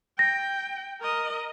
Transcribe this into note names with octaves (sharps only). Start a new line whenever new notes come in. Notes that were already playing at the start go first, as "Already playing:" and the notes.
G5 A#6
A#4 D#5